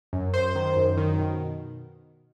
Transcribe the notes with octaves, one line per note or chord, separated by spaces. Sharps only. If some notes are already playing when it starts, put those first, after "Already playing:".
F#2
F#2 C5
D#3
F#2
D#3
B2